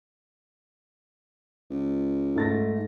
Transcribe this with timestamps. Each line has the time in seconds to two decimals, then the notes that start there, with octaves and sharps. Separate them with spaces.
1.70 C#2
2.36 G#2 A3 A6 A#6